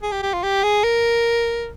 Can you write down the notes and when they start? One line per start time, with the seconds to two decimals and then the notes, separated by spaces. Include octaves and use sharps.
0.03 G#4
0.12 G4
0.22 G4
0.33 F4
0.43 G4
0.63 G#4
0.84 A#4